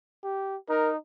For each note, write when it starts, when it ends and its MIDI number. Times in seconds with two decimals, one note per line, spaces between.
0.24 0.57 67
0.69 0.97 63
0.69 0.91 70